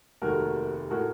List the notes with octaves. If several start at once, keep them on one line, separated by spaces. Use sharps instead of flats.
F1 D#2 D#3 A3 F#4 A#4
A2 A3 F#4 A#4